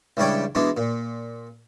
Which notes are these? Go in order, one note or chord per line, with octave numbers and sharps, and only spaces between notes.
C#2 E3 G3 D4 C#5 G5
B2 E3 G#3 D4
A#2